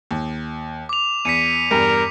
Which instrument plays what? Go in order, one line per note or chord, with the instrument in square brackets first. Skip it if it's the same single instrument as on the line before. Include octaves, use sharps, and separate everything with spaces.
[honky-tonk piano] D#2
[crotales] D6 F7
[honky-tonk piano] E2 [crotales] B6 C#7 D#7
[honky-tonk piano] E2 G2 [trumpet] A#4